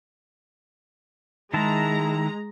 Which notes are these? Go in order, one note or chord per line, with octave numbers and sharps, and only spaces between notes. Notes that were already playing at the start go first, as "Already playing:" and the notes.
D#3 G#3 E4 A5 A#5